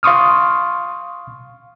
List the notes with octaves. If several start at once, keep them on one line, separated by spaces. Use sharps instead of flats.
F5 C6 C#6 D#6 F6